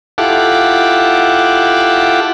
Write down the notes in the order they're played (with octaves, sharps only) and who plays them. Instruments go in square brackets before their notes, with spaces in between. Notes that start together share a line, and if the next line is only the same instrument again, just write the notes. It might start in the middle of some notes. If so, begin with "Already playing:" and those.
[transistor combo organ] E4 F4 G4 A4 F#5 D6